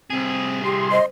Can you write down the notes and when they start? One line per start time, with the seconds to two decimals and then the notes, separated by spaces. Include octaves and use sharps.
0.10 C2 C4 G#4
0.64 G4 C6
0.92 C5 D#5